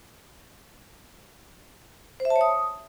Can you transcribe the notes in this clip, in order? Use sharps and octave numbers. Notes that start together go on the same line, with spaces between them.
C5
E5
A5
C#5
D#6